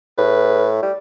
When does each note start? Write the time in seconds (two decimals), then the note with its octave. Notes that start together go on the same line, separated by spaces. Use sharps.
0.18 A2 B4
0.83 G3